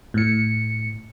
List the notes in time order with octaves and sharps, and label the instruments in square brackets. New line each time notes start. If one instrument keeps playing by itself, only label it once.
[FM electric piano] A2 C#7